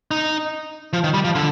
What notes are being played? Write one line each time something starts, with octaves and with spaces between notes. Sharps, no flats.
D#4
F3
D#3
G3
F3
D3